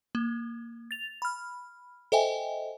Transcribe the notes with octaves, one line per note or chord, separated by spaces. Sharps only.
A#3
A6 F7
B5 F6
A4 C5 D#5 E5 G5 G#5